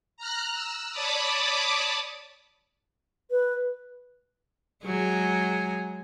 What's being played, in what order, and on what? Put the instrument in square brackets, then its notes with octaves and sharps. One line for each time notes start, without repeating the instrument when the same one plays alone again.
[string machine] A#5 F6 F#6
E6
C#5 D5 A5 B5 D6 D#6
[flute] B4
[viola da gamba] F#3 G#3 G#4